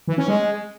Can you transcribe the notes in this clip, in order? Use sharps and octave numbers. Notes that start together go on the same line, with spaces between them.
E3
C#4
G#3